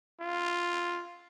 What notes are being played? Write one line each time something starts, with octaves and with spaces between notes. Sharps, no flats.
F4